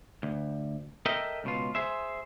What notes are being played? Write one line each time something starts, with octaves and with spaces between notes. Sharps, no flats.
D2
A4 A#4 D#5 E5 G5
C#2 B2 F4
G#4 C5 E5